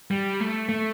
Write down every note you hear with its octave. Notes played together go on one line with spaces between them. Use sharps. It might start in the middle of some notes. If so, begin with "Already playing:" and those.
G3
A3
A3